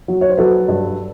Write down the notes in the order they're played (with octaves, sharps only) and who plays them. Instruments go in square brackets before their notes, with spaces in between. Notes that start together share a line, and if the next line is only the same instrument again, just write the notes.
[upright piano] F#3
C#5
C5
F#3 A4 B4
G2